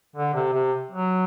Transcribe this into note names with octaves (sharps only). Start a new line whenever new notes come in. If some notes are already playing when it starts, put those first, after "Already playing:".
D3
C3
C3
F#3